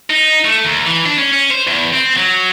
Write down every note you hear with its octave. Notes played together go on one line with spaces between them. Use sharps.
D#4
A3
D#2
E3
D4
C#4
C#4
C5
E2
C4
F#3